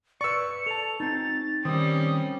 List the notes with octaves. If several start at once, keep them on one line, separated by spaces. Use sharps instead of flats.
B4 D5 C#6 E6 C#7
A4 A5 F7
C4 D#4 A6
D#3 G3 C4 C#4 D#6